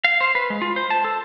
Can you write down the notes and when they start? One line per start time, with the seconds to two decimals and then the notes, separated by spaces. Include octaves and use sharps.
0.04 F5
0.21 C5
0.35 B4
0.50 G#3
0.62 F4
0.76 C5
0.90 A5
1.05 A4